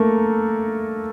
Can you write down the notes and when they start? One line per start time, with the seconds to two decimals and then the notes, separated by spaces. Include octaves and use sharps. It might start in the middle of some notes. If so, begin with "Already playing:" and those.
Already playing: A3 A#3 A4 A#4